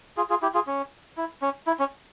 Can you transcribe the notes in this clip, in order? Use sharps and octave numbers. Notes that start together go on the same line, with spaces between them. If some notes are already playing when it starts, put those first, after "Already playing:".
F4 G#4
F4 G#4
E4 G4
F4 G#4
C#4
E4
C#4
E4
C#4